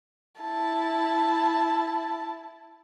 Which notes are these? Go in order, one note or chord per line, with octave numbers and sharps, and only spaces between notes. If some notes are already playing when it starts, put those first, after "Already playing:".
E4 A5